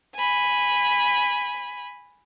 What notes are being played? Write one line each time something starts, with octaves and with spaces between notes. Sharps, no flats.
G#5 B5